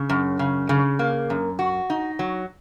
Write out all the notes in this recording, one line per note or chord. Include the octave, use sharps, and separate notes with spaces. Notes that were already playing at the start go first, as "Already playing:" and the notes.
Already playing: C#3
F#2
C#3
C#3
A#3
F#2
F#4
D#4
F#3